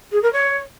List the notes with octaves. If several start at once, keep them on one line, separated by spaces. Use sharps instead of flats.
G#4
A#4
C#5